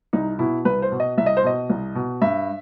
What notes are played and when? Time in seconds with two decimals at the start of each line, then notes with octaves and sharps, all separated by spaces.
0.13 C2 D#4
0.39 B2 E4
0.65 C2 B4
0.82 C5
0.92 B2
1.00 D#5
1.18 C2 E5
1.26 D#5
1.37 C5
1.44 B2 D#5
1.70 C2
1.95 B2
2.22 G2 E5